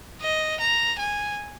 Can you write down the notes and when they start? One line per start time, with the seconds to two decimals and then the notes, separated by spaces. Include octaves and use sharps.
0.21 D#5
0.60 A#5
0.99 G#5